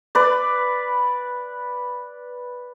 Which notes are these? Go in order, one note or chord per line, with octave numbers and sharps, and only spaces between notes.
B4 D5